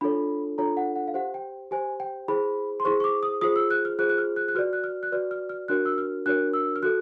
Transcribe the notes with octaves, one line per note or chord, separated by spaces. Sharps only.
D4 F4 A4 C#5 B5
D4 F4 A4 C#5 A#5
F#5
F#5
F5
G4 C5 F#5
G5
G4 C5 G#5
G5
E4 G#4 C5 B5
C6
E4 G#4 C5 C#6
C#6
D6
D#6
F4 G#4 C5 D#6
E6
F#6
F6
F4 G#4 C5 F#6
F#6
F6
F#6
F#6
F#4 B4 D5 F6
F#6
F6
F#6
F#4 B4 D5 F6
F6
F6
D4 F#4 A#4 C#5 F#6
E6
F6
D4 F#4 A#4 C#5 F#6
E6
F6
F#4 A4 F#6